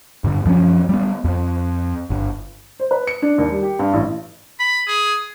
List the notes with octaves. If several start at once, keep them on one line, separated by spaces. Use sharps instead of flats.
G2 D3
F#2 F3 C4 C#4
G3 B3
F2
G1
C5
B4
C#7
D4
D#2
G3
G4
G2
A1
B5
G#4